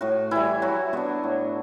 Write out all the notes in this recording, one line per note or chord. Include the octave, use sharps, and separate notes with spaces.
A2 F#4
E3 G3 E4
F#3 F#4
B3 D4 F#4
A2